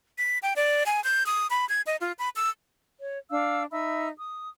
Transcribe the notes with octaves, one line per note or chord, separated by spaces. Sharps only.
B6
G5
D5
G#5
G6
D#6
B5
G#6
D#5
F4
B5
E6
C#5
D4 F5 E6
D#4 E5 B5 E6
D#6